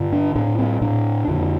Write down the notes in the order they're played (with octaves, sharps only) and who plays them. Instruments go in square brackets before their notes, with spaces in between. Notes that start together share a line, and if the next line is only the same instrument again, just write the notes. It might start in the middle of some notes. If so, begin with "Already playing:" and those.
Already playing: [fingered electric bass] G2 D3
D4
A2 D4
C4
A2 D4
F2 D3